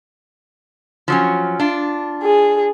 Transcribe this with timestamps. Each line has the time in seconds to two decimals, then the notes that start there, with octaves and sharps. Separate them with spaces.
1.08 F3 F#3 C#4
1.60 D4 F4
2.23 G#4